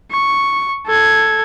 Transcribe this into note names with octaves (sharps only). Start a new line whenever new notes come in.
C#6
A4 G#6